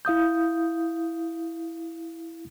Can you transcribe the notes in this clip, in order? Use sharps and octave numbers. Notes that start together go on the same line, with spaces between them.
E4 F5 D#6 G6